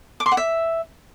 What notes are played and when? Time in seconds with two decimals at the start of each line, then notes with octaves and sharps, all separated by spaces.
0.20 D6
0.26 C6
0.32 F#5
0.37 E5